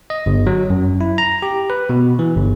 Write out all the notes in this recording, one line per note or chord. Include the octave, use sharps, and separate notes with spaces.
D#5
G1
F#3
F#2
E4
A#5
G4
B4
B2
E3
G1